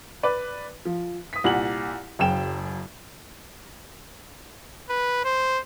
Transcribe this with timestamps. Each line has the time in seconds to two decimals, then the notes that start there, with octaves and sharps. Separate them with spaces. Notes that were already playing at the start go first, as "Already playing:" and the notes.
0.23 B4 D5
0.85 F3
1.33 D#6 B6
1.44 C2 A#2 F#5 F#7
2.19 F#1 F#2 C#3 G5 E7
4.89 B4
5.25 C5